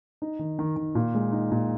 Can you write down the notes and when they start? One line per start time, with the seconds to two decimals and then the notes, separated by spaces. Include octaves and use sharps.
0.22 D#4
0.39 D#3
0.59 D#3
0.76 D#3
0.95 A#2
1.15 G#3
1.32 D#4
1.52 A#2